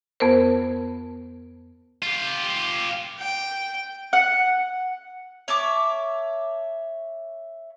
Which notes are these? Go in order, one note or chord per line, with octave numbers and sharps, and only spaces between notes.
F2 B3 A#4 C5
F4 G4
G5
F#5
C#5 E5 A5 D6